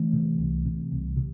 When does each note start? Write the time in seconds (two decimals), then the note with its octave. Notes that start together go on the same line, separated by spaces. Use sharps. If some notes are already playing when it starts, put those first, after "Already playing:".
Already playing: E3 A3
0.13 C3
0.38 C2
0.65 C3
0.92 C2
1.16 C3